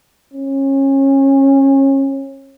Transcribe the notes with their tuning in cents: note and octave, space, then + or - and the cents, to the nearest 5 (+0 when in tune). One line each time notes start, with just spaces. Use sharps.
C#4 -25